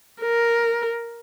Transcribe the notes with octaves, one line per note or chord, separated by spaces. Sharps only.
A#4